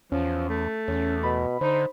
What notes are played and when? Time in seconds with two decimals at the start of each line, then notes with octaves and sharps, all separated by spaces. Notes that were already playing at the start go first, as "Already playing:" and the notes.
0.12 E2 F3 C#4
0.49 A3
0.88 E2 C#4
1.23 B2 B5
1.61 D3 D#4 C5